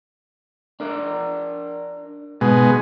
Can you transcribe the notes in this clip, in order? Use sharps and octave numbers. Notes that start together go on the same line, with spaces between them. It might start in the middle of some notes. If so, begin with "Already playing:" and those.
D4 A#4 D5
G#2 B2 G#3